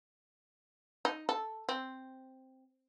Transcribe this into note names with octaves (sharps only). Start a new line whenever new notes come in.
D#4
A4
C4